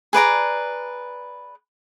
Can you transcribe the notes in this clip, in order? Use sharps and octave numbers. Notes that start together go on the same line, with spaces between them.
G#4 B4 D5 A#5